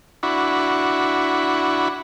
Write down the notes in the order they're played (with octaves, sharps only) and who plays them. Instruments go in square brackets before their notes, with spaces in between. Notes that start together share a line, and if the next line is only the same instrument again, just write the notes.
[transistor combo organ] D4 E4 F#4 B5 C#6